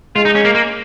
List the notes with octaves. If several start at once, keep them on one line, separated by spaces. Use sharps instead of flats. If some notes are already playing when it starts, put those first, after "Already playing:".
G#3 F4
D#4
C#4
A#3
A#3